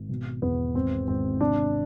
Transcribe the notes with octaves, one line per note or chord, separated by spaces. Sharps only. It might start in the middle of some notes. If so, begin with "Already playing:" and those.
Already playing: G#1
B2
E2 B3
G#1 C4
G#1 C4
C3 D4